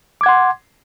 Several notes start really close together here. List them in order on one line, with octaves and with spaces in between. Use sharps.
D6 G#6 F#5 C6